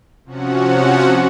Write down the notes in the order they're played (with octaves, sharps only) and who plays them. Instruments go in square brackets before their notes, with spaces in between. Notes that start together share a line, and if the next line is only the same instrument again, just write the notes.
[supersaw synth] C3 F3 C#4 F#4 F#5